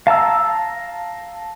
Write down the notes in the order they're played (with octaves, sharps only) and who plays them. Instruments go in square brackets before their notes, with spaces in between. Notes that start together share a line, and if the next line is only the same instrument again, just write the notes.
[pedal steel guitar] F5 A5 A#5 E6